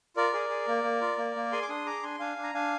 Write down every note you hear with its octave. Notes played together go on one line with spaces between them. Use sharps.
F4 A#4 D5
G#4
G#4
A#3
A#3
F4
A#3
A#3
G#4 G#5 C6
D6
D4 C6 D#6
G#4 A#5 D6
D4 G#5 C6
D4 F5 G#5
D4
A#5
D4 F5 G#5